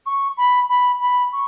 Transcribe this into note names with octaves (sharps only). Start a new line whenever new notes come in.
C#6
B5
B5
B5
C#6